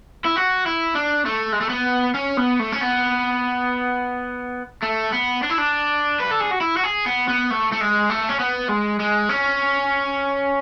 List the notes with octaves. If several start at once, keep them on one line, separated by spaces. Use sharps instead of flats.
E4
F#4
E4
D4
A3
G#3
A3
B3
C#4
B3
A3
C#4
B3
A3
B3
D4
E4
D4
B4
A4
G#4
F#4
E4
F#4
G#4
B3
B3
A3
A3
G#3
A3
C#4
B3
G#3
G#3
C#4